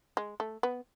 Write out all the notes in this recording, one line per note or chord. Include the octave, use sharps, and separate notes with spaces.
G#3
A3
B3